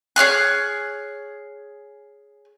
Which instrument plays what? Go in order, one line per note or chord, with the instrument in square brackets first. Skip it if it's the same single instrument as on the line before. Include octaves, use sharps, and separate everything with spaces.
[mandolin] G#4 C#5 F6 F#6